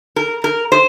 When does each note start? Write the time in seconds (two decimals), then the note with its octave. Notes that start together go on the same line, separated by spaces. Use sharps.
0.16 A#4
0.44 A#4
0.72 C5